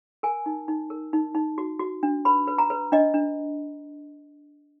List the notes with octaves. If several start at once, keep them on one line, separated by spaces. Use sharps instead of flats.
A#4 G#5
D#4
D#4
A#4
D#4
D#4
F#4
F#4
D4
B4 B5
B4
A#5
B4
D4 D#5
D4